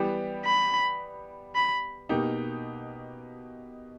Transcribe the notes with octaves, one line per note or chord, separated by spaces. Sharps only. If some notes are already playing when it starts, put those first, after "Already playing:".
Already playing: E3 G3 B3 G4
B5
B5
B2 A#3 D#4 G4